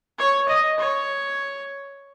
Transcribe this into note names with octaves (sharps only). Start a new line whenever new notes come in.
C#5
D#5
C#5